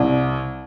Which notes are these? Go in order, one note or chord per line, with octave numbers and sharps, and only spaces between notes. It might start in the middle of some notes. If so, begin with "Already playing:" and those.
Already playing: C2